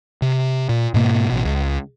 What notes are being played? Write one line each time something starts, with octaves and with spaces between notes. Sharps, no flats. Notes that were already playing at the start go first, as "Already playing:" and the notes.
C3
A#2
G#2 B2 A#3
A1 B2
C#2